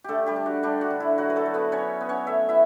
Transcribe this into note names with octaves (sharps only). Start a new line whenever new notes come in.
D3 A3 G4 A4
G3 G4
D4
F#4
G3 D4 G4
F#4
D3
E4
F#3 F#4
B4
A3 A4
F#3
B3 B4
F#3 C#4 C#5
B3
C#4 C#5
A3 E5
E4 E5